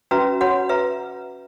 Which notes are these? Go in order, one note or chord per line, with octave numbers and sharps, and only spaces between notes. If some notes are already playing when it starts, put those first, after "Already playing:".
C#4 F#4 B4 E5 A#5
F#4 C#5 F#5 B5
B4 E5 A#5